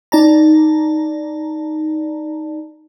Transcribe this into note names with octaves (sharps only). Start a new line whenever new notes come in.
D#4 D5 A5 A#5